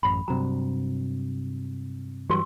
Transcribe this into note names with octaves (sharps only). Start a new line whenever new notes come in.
A1 F#2 B5
G2 C3 F#3 A#5
G2 E3 F#3 G4 C6 E6